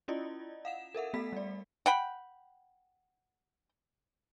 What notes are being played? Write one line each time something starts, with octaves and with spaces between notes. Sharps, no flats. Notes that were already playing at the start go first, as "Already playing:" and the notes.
C#4 E4 F4 D5 D#5
F5 F#5 E7
A4 A#4 E5 F#5
A3 B3 A4 B5 B6
G3 D5
F#5 G5 B5